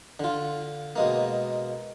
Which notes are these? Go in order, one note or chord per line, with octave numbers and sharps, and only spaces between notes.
D3 F4
B2 G#3 A#3